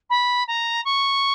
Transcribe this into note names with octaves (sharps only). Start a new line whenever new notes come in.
B5
A#5
C#6